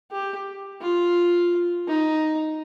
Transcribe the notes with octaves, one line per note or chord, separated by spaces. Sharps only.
G4
F4
D#4